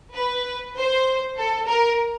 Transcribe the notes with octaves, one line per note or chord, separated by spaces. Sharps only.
B4
C5
A4
A#4